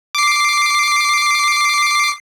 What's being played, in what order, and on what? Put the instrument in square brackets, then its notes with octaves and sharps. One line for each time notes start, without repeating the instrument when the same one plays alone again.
[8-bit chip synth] D6 C7